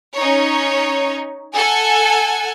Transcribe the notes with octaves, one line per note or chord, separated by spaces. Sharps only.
C#4 D#4 C#5
A4 F#5 G#5